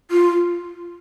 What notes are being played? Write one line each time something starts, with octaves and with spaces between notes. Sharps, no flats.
F4